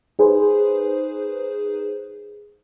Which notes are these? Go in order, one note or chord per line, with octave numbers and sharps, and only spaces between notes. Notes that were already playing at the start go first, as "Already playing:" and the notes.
D#4 G#4 B4 C5